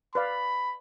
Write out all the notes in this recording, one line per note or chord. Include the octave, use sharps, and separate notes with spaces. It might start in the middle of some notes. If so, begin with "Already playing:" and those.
B4 D5 F5 B5